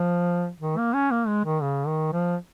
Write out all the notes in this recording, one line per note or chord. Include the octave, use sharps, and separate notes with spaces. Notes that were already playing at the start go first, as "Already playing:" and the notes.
Already playing: F3
D#3
A#3
C#4
A#3
G#3
D#3
C#3
D#3
F3